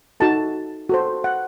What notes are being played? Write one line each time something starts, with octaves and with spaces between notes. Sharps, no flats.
D#4 F#4 A4 A5
F#4 A4 C5
F#5